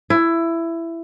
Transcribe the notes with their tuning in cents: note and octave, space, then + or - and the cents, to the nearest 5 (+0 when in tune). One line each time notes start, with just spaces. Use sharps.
E4 +15